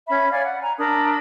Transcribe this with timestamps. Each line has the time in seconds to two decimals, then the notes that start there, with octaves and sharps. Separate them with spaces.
0.07 C#4 E5 B5
0.31 C#5 D5 F5 G#5
0.44 F#5
0.62 G#5 A#5
0.78 D4 A#4 B5 D#6